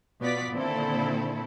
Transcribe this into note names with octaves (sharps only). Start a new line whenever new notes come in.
B2 B3 F4 D5 B6
A#2 D3 D#3 C4 E4 A4